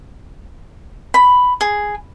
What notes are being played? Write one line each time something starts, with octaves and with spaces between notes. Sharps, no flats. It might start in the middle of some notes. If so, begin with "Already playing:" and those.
B5
G#4